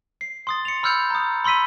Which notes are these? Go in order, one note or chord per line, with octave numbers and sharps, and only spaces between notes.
C7
C6 D#6 A6
C#7 F7
B5 E6 F6 G6 C#7 F7
A#5 D#6
B5 C6 E6 B6 D#7